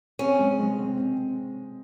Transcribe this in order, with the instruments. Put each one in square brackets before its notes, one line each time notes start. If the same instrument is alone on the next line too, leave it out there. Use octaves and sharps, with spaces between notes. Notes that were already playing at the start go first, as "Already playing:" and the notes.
[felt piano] C4 [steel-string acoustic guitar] C#4
[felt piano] G#3
G#3
C4
C4